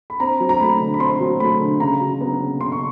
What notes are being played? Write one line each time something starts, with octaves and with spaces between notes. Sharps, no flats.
B5
C4 A#5
F#3
A#5
A3 B5
D3
B5
C4 C6
F#3
A3 B5
D3
C#3 A#5
F#3
B3 A#5
C#3
C#3 C6
C#6